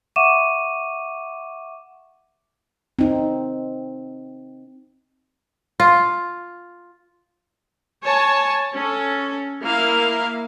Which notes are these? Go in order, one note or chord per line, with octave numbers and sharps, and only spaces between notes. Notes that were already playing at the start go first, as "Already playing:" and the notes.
E5 F#5 C#6 D6 D#7 E7
C4 D#4
F4
C#5 G#5 A5
C#4 A4
A#3 E4 F5